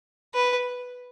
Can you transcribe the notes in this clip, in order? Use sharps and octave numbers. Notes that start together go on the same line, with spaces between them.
B4